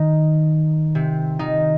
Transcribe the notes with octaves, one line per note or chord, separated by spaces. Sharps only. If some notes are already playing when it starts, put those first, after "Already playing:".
Already playing: D#3 D#4
C3 C4
D#3 D#4